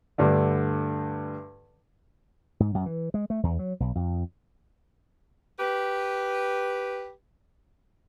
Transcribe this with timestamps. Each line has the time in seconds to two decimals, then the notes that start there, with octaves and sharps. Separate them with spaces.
0.18 D2 G2 D3
2.60 G#2
2.75 F#2
2.86 E3
3.14 G#3
3.30 A3
3.43 E2
3.59 F#3
3.80 B1
3.95 F2
5.60 G4 B4